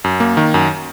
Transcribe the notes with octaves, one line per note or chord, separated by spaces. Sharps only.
F#2
A#3
D#3
F#2